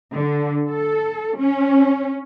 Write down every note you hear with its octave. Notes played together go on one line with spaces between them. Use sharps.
D3
A4
C#4